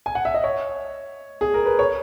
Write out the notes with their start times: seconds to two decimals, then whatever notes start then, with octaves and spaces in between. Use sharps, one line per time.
0.06 G#5
0.15 F#5
0.25 E5
0.34 D#5
0.44 C#5
1.41 G#4
1.54 A#4
1.66 B4
1.79 C#5